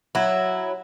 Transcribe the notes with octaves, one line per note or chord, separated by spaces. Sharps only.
F#3 E4